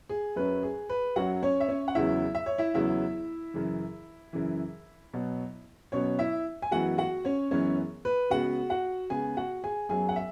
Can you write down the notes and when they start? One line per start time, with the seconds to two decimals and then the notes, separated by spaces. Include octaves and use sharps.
0.09 G#4
0.36 F#2 F#3 C#4 B4
0.63 G#4
0.89 B4
1.16 F#2 F#3 C#4 F#4 F#5
1.43 C#4 C#5
1.60 E5
1.68 C#4 C#5
1.88 F#5
1.95 E2 C#3 F#3 B3 E4 E5
2.35 E5
2.46 C#5
2.58 E4 E5
2.74 E2 C#3 F#3 B3 E4 E5
3.54 F#2 C#3 E3
4.33 F#2 C#3 E3
5.14 B2 F#3 B3
5.92 B2 F#3 B3 C#4 C#5
6.19 E4 E5
6.62 G#5
6.71 F#2 E3 G#3 B3 F#4 F#5
6.98 F#4 F#5
7.25 C#4 C#5
7.51 F#2 E3 G#3 B3 C#4 C#5
8.05 B4
8.30 C#3 G#3 B3 F#4 F#5
8.70 F#4 F#5
9.10 C#3 G#3 B3 G#4 G#5
9.37 F#4 F#5
9.64 G#4 G#5
9.89 F#2 F#3 B3 G#4 G#5
10.09 F#5
10.16 E5